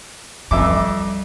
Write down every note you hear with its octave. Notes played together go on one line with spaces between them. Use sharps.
F2 G3 E5 D6